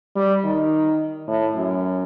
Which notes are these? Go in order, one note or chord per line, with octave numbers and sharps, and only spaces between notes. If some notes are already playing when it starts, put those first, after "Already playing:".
G3
D#3
A2
F#2